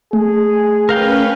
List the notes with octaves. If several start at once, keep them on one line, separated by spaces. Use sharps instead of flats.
A3 G#4
C#4 A#4 B4 F5 G5